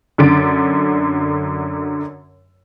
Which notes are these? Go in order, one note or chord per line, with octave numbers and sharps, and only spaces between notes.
F#2 D3 A6 D7